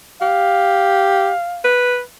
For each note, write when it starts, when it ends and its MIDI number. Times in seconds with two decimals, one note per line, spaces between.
0.22 1.31 67
0.22 1.70 77
1.65 2.00 71